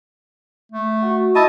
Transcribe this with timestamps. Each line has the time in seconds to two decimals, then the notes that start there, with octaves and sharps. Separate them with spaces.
0.72 A3
1.02 F#4
1.36 E4 D#5 A5